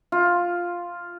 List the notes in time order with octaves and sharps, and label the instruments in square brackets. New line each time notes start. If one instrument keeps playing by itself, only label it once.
[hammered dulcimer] F4